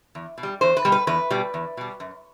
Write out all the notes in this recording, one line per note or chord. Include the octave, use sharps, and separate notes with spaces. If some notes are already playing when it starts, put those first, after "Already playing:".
E2
B2
G3
E2 C5
B4
B2 G3
B4
E2 B4
B2 G3
E2
B2 G3
F#2